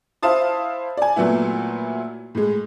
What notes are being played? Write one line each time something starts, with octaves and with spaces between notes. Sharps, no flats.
E4 C5 F5 A5 D#6
D5 G#5
A#2 F#3 A3 B3 E4
A2 G#3